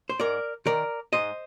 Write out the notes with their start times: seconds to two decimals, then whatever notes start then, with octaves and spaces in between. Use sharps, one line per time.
0.09 C5
0.20 G#2 A#4 D5
0.66 D#3 A#4 D5
1.13 G#2 C5 D#5